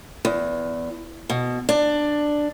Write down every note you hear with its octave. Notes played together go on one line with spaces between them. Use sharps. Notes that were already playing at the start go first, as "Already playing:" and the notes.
E2
B2
D4